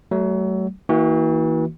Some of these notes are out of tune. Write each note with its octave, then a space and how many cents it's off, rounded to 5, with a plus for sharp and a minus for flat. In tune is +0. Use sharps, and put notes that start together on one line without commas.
F#3 +30 A3 -15
E3 -40 A#3 -10 F#4 +0